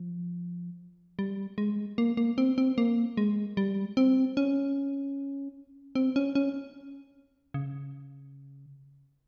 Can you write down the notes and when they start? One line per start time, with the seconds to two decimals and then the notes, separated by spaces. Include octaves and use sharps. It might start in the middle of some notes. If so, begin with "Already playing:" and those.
Already playing: F3
1.19 G3
1.58 G#3
1.98 A#3
2.17 A#3
2.38 C4
2.58 C4
2.78 A#3
3.17 G#3
3.57 G3
3.97 C4
4.37 C#4
5.95 C4
6.16 C#4
6.35 C#4
7.54 C#3